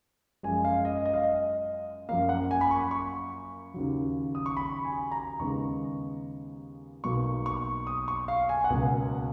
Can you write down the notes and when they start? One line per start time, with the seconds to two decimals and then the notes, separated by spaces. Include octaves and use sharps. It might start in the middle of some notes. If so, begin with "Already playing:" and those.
0.43 F#2 F3 G#3 G#5
0.64 F5
0.85 D#5
1.05 D#5
1.14 F5
1.23 D#5
2.09 F#2 F3 A#3 F5
2.29 F#5
2.51 G#5
2.61 B5
2.71 C#6
2.91 C#6
3.74 D#2 C#3 F#3
4.35 D#6
4.46 C#6
4.57 B5
4.85 G#5
5.11 A#5
5.39 D#2 C#3 G#3 B3 C#6
7.04 B1 B2 A#3 C#6
7.46 C#6
7.87 D#6
8.08 C#6
8.28 F5
8.49 G#5
8.64 F#5
8.69 C#2 B2 F#3 A#3 G#5